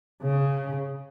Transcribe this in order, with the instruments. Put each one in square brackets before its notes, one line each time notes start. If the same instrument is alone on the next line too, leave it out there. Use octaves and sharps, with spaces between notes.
[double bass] C#3